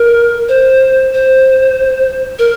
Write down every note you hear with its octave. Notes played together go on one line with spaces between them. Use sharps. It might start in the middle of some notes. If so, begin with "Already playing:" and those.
Already playing: A#4
C5
C5
A#4